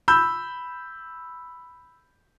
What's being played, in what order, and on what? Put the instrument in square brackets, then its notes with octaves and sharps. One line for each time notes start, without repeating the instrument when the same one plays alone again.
[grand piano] B5 E6 G6